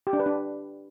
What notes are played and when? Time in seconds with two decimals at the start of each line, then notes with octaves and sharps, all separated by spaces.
0.07 G4
0.13 D4
0.20 B4
0.26 D4